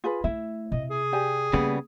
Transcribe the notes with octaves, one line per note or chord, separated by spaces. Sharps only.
F4 G#4 B4
A3 E4 E5
C3 D#5
G#4
G4 D5 G#5
C#3 G3 A#3 B3